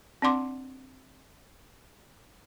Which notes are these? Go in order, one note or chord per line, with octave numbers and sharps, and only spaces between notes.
C4 D4 D5 F#5 C6 D6